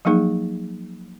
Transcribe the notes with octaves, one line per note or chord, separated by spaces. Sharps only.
F3 F#3 A#3 D#4 G#4